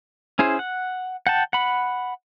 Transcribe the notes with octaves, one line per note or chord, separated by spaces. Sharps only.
C#4 E4 G#4 C5
F#5
F#5 G5 A5
F#5 B5